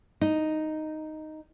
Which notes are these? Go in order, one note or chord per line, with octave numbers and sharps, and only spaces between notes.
D#4